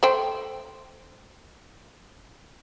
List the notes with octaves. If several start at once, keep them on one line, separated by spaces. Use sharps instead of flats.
A3 C5 G5